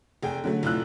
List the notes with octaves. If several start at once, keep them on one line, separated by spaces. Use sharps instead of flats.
F1 G#4 G5
D3 F#3 A3
F1 A2 F4 E6 F#6